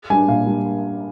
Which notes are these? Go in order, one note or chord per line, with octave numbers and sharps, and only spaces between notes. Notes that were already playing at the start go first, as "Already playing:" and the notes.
G3 D4 G#5
A#2 F5
G3 D4